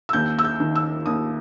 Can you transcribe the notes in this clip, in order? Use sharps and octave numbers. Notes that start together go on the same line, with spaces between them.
E6
D#2 G6
E6
G6
D#3
E6
D#2 D#6